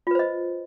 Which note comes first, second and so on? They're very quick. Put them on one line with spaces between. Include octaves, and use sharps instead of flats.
F4 B4 C5 D#5